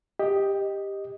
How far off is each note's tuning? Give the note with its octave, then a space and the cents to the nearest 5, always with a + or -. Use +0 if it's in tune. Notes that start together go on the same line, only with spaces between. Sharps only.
G4 +10 D#5 +0